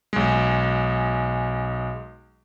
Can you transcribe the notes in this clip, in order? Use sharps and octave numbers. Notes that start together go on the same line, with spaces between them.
B1 G#3